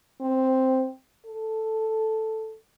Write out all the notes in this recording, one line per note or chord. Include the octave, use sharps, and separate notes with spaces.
C4
A4